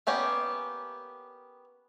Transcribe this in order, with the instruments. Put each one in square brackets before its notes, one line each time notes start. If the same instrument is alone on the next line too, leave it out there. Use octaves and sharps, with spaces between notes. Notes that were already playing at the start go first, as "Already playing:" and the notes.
[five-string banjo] A#3 B3 C#4 G4 D5